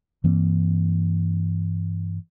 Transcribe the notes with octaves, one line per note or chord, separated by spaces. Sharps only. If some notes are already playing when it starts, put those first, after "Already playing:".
G2 E3 A#3 C4